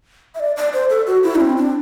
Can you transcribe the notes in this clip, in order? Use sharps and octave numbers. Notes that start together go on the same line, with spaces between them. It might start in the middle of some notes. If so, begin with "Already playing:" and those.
E5
D5
D5
C5
A4
F#4
E4
D4
C4
D4